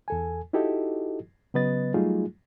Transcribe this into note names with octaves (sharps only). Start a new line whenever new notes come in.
E2 A4 G#5
D#4 E4 F#4 G4 A4 D#5
C#3 F#3 B3 B4 D#5 A6
F#3 G3 A3 D#4 F4 G#4